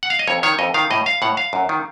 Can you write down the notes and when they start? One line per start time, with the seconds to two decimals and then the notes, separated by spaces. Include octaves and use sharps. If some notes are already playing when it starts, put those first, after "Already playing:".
0.03 F#5
0.10 F5
0.19 D#5
0.27 F2 C#5
0.43 D#3 C#5
0.59 F2 D#5
0.74 D#3 F5
0.90 A2 D#5
1.06 F5
1.22 A2 F#5
1.37 F5
1.53 F#2
1.69 D#3